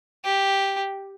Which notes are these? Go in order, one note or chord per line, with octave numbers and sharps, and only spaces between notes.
G4